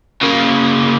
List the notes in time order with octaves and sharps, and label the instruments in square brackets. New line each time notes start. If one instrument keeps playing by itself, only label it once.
[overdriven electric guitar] C#3 A#3